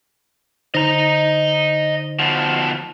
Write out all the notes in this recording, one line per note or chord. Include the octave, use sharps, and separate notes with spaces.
D3 D#4 C5 D#5 A#5
B2 F3